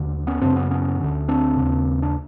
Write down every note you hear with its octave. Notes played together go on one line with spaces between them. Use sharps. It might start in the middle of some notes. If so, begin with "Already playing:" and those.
Already playing: D#2 D3
B3 C#4
F#2 C#3 C4 D4
B3 C#4
B3 C#4
D2 D3
C4 D4
D#2 C#3
D4